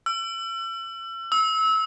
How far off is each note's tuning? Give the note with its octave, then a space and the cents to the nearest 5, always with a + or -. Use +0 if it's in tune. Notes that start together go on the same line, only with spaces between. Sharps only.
E6 +40
E6 -25